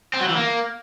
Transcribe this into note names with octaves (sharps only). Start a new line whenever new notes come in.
C4
F#3
E3
A#3